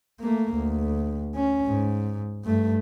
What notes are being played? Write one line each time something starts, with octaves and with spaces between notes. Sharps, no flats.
A3 A#3
D2
C#4
G#2
G2 A3